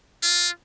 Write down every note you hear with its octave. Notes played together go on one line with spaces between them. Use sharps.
F4